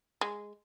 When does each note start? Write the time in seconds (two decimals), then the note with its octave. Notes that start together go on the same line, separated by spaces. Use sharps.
0.21 G#3